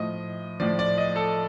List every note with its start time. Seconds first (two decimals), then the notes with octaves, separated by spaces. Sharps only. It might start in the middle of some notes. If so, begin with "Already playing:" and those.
Already playing: A2 F3 D#5
0.60 A2 F3 D5
0.79 D5
0.98 D#5
1.16 A4